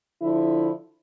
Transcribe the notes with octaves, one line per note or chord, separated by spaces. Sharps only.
D3 F3 E4